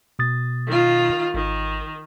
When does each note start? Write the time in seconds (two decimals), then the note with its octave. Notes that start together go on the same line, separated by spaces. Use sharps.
0.19 B2 D#6 A6
0.67 D#3 F4
1.34 G#1 D#3